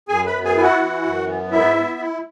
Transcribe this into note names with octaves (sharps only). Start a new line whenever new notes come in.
F#2 G#4 G#5
B4 B5
B3
G#4 G#5
E4 G#5
F#4 F#5
E3
F#2
B3
G#2 E4 E5
B3
E4